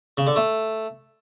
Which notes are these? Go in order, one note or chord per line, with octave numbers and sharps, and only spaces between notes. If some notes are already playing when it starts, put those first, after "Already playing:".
C#3
D3
A3